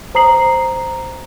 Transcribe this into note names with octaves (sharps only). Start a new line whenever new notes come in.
C5 A#5 D#6 C7 F#7